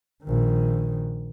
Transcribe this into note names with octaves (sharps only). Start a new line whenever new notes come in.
A#1 D#3